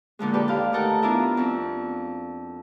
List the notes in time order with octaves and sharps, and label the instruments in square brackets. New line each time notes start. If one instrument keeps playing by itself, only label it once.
[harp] A#2 D3 F3 G#3
G4 A4 B4 D5
D#2 F5
A3 D#4 A4 A#4 F#5
B3 D4 E4 F4 A#4 E5
F2 C4